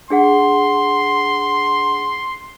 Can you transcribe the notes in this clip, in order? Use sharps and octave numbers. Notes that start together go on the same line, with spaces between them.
D4 G#4 F#5 C6